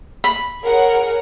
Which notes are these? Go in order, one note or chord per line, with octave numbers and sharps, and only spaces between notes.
B5
G#4 A#4 C#5 F#5